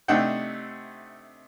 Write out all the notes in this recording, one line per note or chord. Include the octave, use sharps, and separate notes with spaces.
C3 A3 D4 D#4 F#5 G5